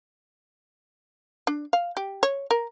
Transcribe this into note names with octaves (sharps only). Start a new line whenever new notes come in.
D4
F5
G4
C#5
A#4